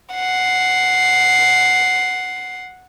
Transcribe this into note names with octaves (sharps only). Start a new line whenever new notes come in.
F#5 C7